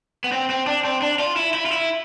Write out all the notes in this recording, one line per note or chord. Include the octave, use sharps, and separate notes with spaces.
B3
C4
C4
D4
C4
D4
F4
E4
E4
F4
E4